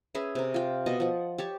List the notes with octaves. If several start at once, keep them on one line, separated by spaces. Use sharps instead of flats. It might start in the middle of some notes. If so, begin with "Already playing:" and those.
C#4 G#4 B4 E5
C3 A#4
F4 G5
B2 D#5 A5
F3 F#5
G4 C#5 A5